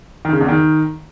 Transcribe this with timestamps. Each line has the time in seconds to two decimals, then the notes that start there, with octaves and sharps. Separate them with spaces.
0.25 D#3
0.33 C#3
0.40 E2
0.48 D#3